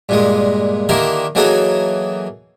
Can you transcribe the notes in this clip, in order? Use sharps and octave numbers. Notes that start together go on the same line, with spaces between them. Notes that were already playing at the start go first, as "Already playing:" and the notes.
G2 A#2 G#3
D3 D#3 A#3 E4 G4 A#4
E3 F#3 A#3 D#4 G#4 A4